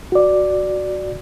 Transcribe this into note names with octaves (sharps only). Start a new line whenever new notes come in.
F#4 D5